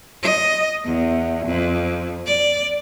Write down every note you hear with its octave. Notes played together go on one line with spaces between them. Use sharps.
D#5
E2
F2
D5